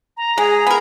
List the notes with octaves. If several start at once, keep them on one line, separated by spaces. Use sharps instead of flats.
A#5
G#3 G#4
B3 A#4